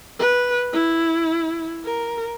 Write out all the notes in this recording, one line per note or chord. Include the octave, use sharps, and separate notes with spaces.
B4
E4
A#4